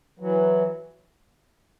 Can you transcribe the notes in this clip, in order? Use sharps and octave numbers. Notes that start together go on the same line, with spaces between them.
E3 F#3